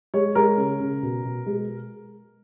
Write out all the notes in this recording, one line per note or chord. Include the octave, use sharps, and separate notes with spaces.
G#3 C#5
G#3 A#4
C#3
C#3
B2
B2
G#3